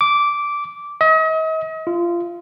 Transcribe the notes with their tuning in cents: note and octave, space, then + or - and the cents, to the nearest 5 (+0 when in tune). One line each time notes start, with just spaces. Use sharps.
D6 -10
D#5 +40
F4 -20